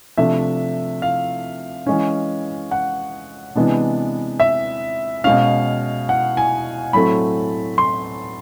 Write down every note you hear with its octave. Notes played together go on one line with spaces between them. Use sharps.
C3 F3 A3 D4 E5
F5
E3 G#3 C#4
F#5
C3 E3 G#3 B3 D4
E5
B2 G#3 C#4 F5
F#5
G#5
A2 F#3 A3 C4 B5
C6